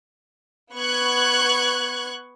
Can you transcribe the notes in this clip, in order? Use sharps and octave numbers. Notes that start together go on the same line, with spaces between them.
B3 C#6 F#6 G#6